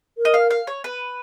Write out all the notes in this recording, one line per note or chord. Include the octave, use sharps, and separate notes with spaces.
A#4
D#5
F5
F5
C#5
B4